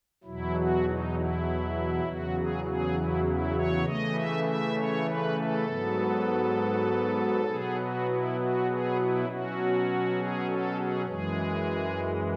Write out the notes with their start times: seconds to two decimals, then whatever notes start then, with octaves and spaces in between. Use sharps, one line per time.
0.24 E2 B2 F#3 E4
0.54 F#4
0.84 D#4
1.14 E4
2.04 E2 C#3 F#3 F#4
2.35 G#4
2.64 G#4
2.94 E4
3.24 E4
3.54 C#5
3.85 C#3 E3 A3 D#5
4.14 E5
4.44 E5
4.75 C#5
5.05 B4
5.35 A4
5.65 G#2 F#3 B3
7.45 B2 F#3 B3 G#4
7.75 F#4
8.05 E4
8.36 F#4
8.66 G#4
8.96 E4
9.25 B2 F#3 C#4 F#4
10.16 G#4
10.45 A4
10.76 G#4
11.06 F#2 E3 G#3 G#4